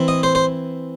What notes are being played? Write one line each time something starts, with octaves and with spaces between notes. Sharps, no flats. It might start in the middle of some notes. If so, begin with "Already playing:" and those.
Already playing: E3 C4 E4
D#5
C5
C5